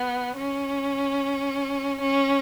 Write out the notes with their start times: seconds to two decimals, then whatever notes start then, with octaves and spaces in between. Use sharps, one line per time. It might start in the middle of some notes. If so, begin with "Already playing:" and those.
Already playing: B3
0.36 C#4
2.01 C#4